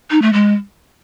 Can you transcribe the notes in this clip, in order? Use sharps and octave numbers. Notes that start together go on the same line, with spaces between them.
D#4
A3
G#3